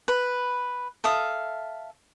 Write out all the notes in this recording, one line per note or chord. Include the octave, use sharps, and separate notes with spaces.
B4 B5
A4 E5 F5 D#6